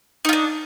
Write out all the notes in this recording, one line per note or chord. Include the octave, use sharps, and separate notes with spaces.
D4 D#4 F4